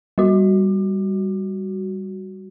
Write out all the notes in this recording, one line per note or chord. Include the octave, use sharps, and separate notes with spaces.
G3 F#4